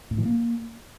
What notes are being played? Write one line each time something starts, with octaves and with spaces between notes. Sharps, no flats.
A2
E3
A#3